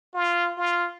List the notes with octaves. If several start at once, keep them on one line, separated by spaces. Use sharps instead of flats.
F4
F4